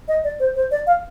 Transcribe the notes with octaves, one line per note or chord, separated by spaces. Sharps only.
D#5
D5
C5
C5
D5
F5